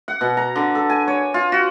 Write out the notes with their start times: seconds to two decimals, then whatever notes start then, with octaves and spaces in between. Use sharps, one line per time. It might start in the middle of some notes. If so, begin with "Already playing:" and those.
0.08 F#5
0.21 B2
0.37 A#5
0.56 D3
0.75 A4
0.90 G#5
1.08 C#5
1.34 F4
1.52 F#4